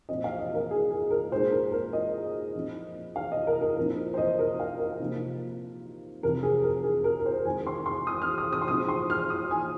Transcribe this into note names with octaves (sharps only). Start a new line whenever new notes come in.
A#2 F3 C4 D#5
F5
D#5
A#4
G#4
G#4
A#4
A#2 G#3 D#4 C5
A#4
A#4
D#5
A#2 F3 C4 D#4
F5
D#5
A#4
A#4
A#2 F3 C4 D#4 A#4
C5
D#5
A#4
F5
A#4
C3 F3 A#3 D#4
F2 C3 F3 C4 A#4
G#4
A#4
G#4
A#4
A#4
C5
F2 D#3 G#3 G#5
C6
C6
D#6
F6
D#6
D#6
C6
A#2 F3 G#3 C4 D#4 D#6
C6
F6
D#6
G#5